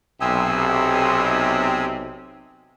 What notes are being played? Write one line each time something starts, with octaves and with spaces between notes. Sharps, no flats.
B1 C3 G#5 D#6 E6